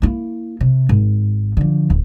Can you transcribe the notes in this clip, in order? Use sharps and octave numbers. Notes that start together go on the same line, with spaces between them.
A#3 E4
C3
G#1
D3 F3
D1